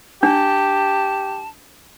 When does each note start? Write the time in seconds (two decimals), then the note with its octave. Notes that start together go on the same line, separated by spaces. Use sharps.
0.23 D4 G4 A5